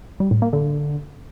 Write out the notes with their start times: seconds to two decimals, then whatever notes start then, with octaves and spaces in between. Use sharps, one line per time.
0.20 G3
0.31 A2
0.42 A#3
0.53 D3